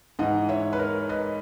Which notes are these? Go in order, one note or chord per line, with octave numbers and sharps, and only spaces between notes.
G#2 E3 D#5 F#5
C#5 E5
B4
A#4 C#5
B4 D#5